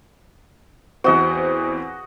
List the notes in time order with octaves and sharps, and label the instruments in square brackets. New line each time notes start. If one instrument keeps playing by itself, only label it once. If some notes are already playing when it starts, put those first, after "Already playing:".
[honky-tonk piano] E2 C4 [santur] F#4 D#5 F#5